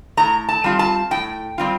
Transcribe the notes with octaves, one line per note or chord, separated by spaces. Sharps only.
A2 A#5
A5
G3 C4 F4
A5
A2 G5
G3 C4 F4